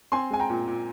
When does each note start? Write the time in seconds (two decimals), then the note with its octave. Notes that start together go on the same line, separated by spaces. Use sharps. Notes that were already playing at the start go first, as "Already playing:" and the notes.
0.12 C4 G#5 C6
0.30 G#3 G#5
0.40 G5 A#5
0.50 A#2
0.67 A#2